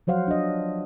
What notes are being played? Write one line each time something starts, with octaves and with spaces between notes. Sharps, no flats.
F3 F#3 C5 F5 F#5
D4 D#5